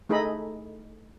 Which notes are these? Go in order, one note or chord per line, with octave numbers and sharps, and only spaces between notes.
A3 D#4 G#4 A4 D#5 B5